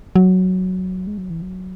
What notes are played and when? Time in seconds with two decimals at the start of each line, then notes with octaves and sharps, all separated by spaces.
0.16 F#3
1.07 G#3
1.18 F#3
1.30 E3
1.42 F#3